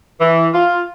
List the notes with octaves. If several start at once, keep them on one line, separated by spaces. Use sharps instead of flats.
E3
F4